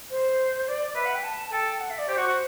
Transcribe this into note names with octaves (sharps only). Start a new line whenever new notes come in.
C5
D5
B4 E5
F#5
G5
A5
A5
A4 G5
F#5
E5
D5
G4 C5
F#4
F#4